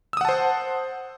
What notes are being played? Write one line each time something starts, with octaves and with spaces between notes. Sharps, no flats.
C5 F#5 A5 D#6 E6